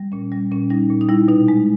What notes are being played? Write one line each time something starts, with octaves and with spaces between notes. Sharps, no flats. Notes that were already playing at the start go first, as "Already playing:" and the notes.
Already playing: G3
A#2 C#4
G3
A#2 C#4
G3 D#4
A#2
D#4
G3 E4
B2 D#4
G#3